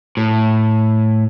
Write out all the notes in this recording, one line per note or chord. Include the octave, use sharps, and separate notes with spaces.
A2